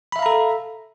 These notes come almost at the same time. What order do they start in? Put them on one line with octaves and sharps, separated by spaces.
B5 E5 F5 A#5 A4